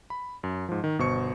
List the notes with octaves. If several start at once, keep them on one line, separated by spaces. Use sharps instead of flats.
B5
F#2
G#2 F3
D#3
G1 B2 C5 C#6 C#7